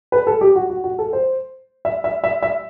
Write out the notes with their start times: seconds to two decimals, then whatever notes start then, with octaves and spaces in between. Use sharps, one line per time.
0.12 B4
0.27 A4
0.41 G4
0.56 F#4
0.70 F#4
0.84 F#4
0.99 A4
1.13 C5
1.85 E5
2.04 E5
2.24 E5
2.42 E5